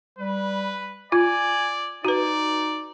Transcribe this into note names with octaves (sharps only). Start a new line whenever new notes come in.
G3 B4
F4 D5 G#5
D#4 F#4 B4 D5